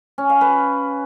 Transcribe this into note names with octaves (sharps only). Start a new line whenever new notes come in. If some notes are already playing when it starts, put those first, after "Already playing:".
C#4
F5
B4